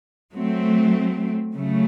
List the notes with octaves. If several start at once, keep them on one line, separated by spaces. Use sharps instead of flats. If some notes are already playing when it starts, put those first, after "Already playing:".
F#3 A3 C4
C#3 F#3 A3